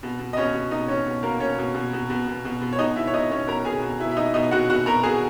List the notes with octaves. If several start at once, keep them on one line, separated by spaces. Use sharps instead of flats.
B2
B2
D#5
B2 C#4 C#5
B2
B2 D#4 D#5
B2 C#4 C#5
B2
B2 A#3 A#4
B2 C#4 C#5
B2
B2
B2
B2
B2
B2
B2
C#5
B2 D#4 D#5
B2 E4 E5
C#5
B2 D#4 D#5
B2 C#4 C#5
B2 A#4 A#5
B2 G#4 G#5
B2
B2 E4 E5
E5
B2 D#4 D#5
B2 D#4 D#5
B2 F#4 F#5
B2 F#4 F#5
B2 A#4 A#5
B2 G#4 G#5